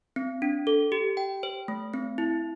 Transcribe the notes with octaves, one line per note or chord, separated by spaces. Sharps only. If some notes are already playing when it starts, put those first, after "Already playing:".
C4
D4
A4
G4
G5
C5
A3
C4
E4